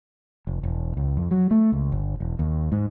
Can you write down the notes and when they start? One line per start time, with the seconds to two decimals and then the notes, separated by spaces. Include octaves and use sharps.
0.47 F1
0.63 E1
0.97 C#2
1.17 F2
1.31 F#3
1.51 A3
1.72 C#2
1.92 G1
2.20 E1
2.39 D#2
2.72 G#2